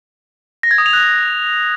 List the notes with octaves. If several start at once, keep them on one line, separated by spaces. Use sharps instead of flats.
A#6
G#6
D#6
F7
F#6